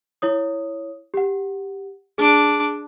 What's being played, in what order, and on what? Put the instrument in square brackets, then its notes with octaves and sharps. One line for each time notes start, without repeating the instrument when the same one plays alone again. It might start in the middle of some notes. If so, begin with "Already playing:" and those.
[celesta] E4 C#5 D#6
G4 F#5
[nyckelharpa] D4 D6 [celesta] G#4